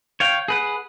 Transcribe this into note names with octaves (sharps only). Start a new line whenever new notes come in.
C#5 F5 G5
G#4 B4 F#5